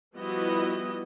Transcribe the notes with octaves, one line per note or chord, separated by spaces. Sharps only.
F3 G3 B3 E4 F#4 D#5